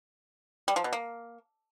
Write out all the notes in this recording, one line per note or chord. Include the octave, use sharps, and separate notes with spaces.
G3
F3
B2
A#3